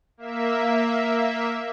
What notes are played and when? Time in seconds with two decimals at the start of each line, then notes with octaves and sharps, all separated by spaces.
0.17 A#3 E5